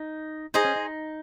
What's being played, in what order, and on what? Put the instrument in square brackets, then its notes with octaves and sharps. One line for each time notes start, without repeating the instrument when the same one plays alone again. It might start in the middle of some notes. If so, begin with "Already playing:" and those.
Already playing: [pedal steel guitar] D#4
[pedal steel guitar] D#4 [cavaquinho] G#4 C5 D#5
[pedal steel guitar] C#4
D#4